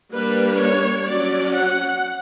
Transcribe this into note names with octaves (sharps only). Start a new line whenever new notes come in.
G3 A#3 D4 B4
C#5
F#3 C#4 D5
F#5